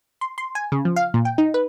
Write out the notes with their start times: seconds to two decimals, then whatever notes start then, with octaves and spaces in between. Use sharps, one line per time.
0.21 C6
0.38 C6
0.55 G#5
0.72 C#3
0.85 F3
0.96 F5
1.14 A#2
1.25 G5
1.38 D#4
1.54 B4